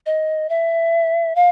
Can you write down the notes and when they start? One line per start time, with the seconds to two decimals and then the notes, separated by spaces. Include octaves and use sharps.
0.06 D#5
0.49 E5
1.36 F5